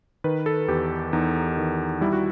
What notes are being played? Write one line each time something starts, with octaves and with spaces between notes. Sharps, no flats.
D#3 B4
A4
E2 G4
E2 D#4
D#3
G3 E4
F#4